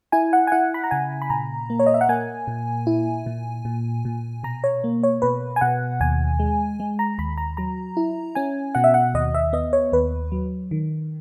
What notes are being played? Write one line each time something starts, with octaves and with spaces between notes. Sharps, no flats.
E4 G#5
F#5
G#5
E4 F#5
B5
A#5
C#3 G#5
B5
A#2 A#5
A#3
C#5
D#5
E5
F#5
A#3 G#5
A#2
E4
A#2
A#2
A#2
B2 A#5
C#5
A#3
C#5
B2 B4
G#5
B2 F#5
D#2 G#5
G#3
G#3
A#5
D#2 B5
A#5
F#3 A#5
E4
C#4 G#5
B2 F#5
E5
F#5
D#2 D#5
E5
B3 D#5
C#5
D#2 B4
F#3
D#3